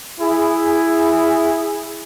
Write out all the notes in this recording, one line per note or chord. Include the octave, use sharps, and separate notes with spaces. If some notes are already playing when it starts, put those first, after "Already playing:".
E4 G#4